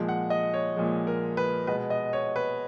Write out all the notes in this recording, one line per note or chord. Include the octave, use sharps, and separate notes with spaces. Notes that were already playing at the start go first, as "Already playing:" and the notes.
Already playing: A#2 F3 G#3
F#5
D#5
C#5
A#2 F3 G#3
A#4
B4
B2 G#3 B4
D#5
C#5
B4